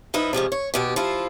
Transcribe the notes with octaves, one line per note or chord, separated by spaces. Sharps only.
F3 D#4 E4 B4
C3 F3 G#3 C#4
C#5
D#2 B2 G4
F3 E4 F4